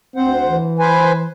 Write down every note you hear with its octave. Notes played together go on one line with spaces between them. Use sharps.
D2 C4 C5 F#5
E3
B4 C5 G#5